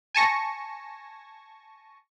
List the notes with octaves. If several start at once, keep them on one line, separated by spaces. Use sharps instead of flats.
G#5 A5 C#6 A#6